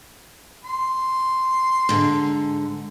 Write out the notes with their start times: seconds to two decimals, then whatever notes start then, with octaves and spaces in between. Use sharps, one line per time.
0.64 C6
1.89 G#2 D3